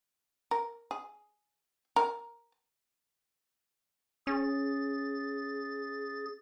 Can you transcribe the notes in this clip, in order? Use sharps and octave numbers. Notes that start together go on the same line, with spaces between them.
A#4
G#4
A#4
C#4 G#4 A6